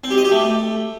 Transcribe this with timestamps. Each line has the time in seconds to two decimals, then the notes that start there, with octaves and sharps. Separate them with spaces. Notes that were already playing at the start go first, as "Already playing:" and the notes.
0.04 C4
0.11 G4
0.18 D#5
0.25 G4
0.31 A3